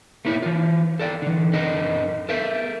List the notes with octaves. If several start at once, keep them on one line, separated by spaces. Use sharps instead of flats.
A3 A#3 E4 B4 C#5
E3 F4
A4 D5 F5 G5
D3 E3
F#2 D4 A4 A#4 D#5
A4 A#4 E5